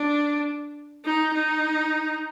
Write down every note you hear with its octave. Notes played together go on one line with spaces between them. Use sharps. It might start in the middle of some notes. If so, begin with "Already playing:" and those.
Already playing: D4
D#4
D#4